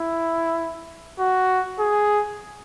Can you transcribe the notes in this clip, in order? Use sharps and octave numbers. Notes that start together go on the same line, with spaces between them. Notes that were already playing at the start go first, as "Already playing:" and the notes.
Already playing: E4
F#4
G#4